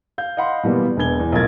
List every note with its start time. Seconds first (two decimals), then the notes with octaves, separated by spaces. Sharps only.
0.18 F5 G6
0.37 D#5 F5 F#5 B5 C6
0.63 B2 E3 G3 A#3 B3
0.97 E1 B3 D4 G#5 G#6 G7
1.20 E2
1.32 B1 A2 F3 A#4 G#6 A6